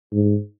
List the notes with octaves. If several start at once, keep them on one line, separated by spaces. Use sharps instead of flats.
G#2